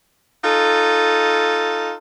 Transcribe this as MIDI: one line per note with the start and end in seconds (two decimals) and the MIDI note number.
0.44 1.93 63
0.44 1.93 65
0.44 1.93 69